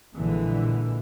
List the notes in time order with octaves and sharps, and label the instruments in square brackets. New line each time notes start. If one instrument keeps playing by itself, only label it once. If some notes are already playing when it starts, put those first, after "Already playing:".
[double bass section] A#1 A#2 D3 E3 G#3